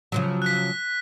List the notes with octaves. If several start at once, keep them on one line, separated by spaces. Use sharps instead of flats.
C#3 F3 F#3
F#6 B6